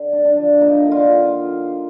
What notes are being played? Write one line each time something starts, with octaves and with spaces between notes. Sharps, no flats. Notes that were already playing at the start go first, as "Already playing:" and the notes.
Already playing: D3
D4
D4
F3
A#3 D#4
D3
F4